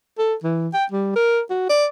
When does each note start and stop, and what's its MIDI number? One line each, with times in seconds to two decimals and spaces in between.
0.18 0.34 69
0.43 0.68 52
0.73 0.85 79
0.91 1.12 55
1.15 1.41 70
1.50 1.66 66
1.69 1.86 74